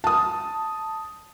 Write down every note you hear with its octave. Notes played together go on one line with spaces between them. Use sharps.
A5 D#6